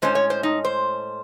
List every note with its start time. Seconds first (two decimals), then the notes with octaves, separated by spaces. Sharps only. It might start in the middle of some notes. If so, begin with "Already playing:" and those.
0.02 A2 G#3 C#4 C5
0.15 C#5
0.30 C5
0.43 D#4
0.64 C5